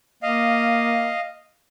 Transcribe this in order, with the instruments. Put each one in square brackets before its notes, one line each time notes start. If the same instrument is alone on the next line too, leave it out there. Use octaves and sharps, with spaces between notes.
[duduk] A#3 [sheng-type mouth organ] D#5 F5